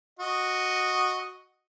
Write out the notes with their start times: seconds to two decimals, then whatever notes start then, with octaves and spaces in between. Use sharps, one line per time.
0.19 F#4 D#5